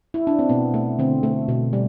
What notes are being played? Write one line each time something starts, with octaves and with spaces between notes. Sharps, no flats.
E4
D4
C4
B2 B3
A3
D3 C4
A3
B2
G3